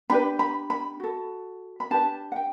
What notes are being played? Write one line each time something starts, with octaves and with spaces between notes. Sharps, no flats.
D4 G4 B4 B5
B5
B5
F#4 A4
B5
D4 G4 B4 A5
F#5
G5